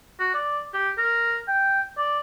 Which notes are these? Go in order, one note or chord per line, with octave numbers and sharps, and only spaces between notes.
F#4
D5
G4
A#4
G5
D5